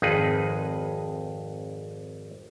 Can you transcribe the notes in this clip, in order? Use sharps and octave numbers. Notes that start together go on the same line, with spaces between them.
G#1 F2 D#4 G#4 B4